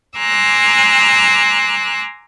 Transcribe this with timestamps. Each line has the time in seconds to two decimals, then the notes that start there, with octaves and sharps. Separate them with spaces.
0.18 G#5 A#5 C6 D6 E6 F#6